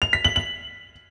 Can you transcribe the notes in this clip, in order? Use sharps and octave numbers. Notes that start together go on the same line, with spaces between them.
F7
B6
F#7
F#7